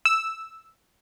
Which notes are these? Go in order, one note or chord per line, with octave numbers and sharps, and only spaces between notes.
E6